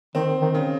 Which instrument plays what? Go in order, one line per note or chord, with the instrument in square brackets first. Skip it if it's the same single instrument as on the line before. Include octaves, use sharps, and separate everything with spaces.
[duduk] D#3 [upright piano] C4
[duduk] D#3
[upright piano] C#3